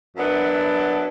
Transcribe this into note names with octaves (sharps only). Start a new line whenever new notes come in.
F#2 F#3 B3 D4 E4 A5